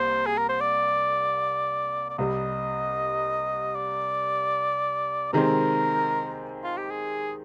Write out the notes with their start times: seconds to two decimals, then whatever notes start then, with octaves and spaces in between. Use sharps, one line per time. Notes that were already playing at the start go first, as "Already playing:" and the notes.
Already playing: C2 A#3 C5
0.26 G#4
0.38 A#4
0.49 C5
0.61 D5
2.10 D5
2.18 C2 C3 G3 D#5
3.75 D5
5.33 C3 D#3 G#3 C4 A#4
6.64 F4
6.77 G4
6.90 G#4